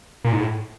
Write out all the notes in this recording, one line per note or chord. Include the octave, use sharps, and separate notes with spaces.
A#2
G#2
A2